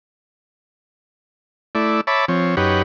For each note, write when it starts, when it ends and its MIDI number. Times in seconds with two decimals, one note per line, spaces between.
1.75 2.01 57
1.75 2.01 64
1.75 2.01 74
2.07 2.25 73
2.07 2.25 76
2.07 2.25 81
2.07 2.25 83
2.07 2.25 86
2.28 2.56 53
2.28 2.56 60
2.28 2.56 73
2.57 2.82 42
2.57 2.82 63
2.57 2.82 67
2.57 2.82 71
2.57 2.82 73
2.57 2.82 78